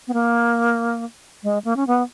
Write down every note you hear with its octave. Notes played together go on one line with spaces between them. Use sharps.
B3
A#3
G#3
A#3
C#4
B3